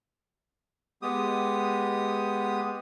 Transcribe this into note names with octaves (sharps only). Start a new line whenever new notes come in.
G#3 B3 G4 D#6